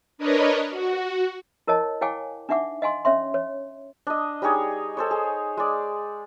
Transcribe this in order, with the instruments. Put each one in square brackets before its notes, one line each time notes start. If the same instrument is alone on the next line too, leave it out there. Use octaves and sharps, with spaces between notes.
[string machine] D4 A#4 B4 C#5 D#5
F#4
[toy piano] E4 A#4 C#5 D#5 A5
E4 C#5 F5 G5 G#5 D6
D4 D#4 E5 F#5 D6
D#5 F5 G#5 C6
C#4 C#5 E5 C6
C#5
[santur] D4 D#5
G3 D#4 G#4 C#5
A4 C5 C#5
G#4
G#3 D5